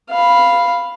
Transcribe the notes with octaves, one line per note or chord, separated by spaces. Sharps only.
F5 B5